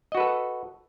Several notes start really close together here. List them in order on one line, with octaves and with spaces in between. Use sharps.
D#5 F#4 B4 A4